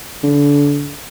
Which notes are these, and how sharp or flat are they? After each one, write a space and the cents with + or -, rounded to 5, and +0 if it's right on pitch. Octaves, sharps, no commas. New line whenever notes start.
D3 -30